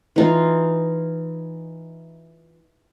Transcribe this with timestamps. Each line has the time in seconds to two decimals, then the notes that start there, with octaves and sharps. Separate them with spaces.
0.16 E3 D#4 F4